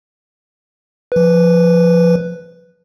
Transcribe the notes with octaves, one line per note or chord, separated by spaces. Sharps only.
F3 B4